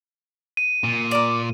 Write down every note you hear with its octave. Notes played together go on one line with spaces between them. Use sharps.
D#7
A#2
A#4 D5